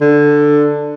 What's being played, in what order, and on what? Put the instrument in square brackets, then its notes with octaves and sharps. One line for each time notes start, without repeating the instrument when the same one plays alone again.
[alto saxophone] D3